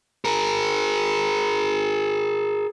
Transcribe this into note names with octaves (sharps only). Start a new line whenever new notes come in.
G#4 A#4